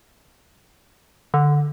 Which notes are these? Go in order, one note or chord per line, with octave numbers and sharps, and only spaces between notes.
D3